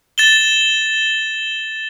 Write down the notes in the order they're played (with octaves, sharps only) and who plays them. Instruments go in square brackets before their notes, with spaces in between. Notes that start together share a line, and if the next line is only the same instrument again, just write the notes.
[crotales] A6 E7 G7